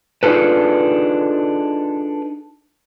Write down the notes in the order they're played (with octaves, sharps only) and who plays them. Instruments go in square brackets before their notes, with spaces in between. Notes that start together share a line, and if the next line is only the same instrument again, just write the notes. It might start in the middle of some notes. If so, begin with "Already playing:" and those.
[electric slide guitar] D4 D#4 F4 G#4 A4 B4